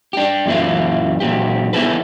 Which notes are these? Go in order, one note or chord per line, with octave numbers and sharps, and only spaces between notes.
D4 G4
F#2 A#2 E3 A3 E4 F4
A#2 F#3 G4
B3 E4 G#4 A4 B4